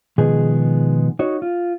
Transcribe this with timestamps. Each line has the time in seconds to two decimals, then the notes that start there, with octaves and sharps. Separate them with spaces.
0.18 B2 D#3 F3 G#3 B3 G#4
1.19 D#4 F#4 C#5
1.42 F4